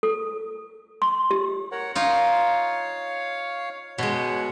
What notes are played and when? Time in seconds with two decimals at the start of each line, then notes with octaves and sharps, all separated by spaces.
0.03 A4
1.02 C6
1.31 G4
1.72 A#4 C#5 F#5
1.95 D#4 F4 C#5 F5
3.98 B2 G#3 C#5 F#5